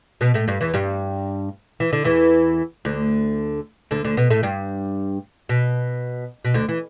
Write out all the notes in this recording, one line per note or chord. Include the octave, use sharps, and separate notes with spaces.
B2 B3
A2 A3
G2 G3
E2 E3
G2 G3
E3
D3
E2 E3
D2 D3
D2 D3
D2 D3
B2 B3
A2 A3
G2 G3
B2
B2
D2 D3
E3